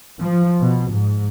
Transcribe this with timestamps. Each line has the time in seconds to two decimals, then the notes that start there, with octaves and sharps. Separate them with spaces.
0.21 F3
0.61 B2
0.92 G#2